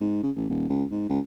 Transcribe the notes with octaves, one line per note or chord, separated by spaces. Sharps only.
G#2
C#3
A1
D#1
C#2
G#2
C#2